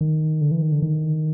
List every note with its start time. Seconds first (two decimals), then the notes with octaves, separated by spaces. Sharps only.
0.01 D#3
0.41 D3
0.51 E3
0.62 D#3
0.72 D3
0.82 D#3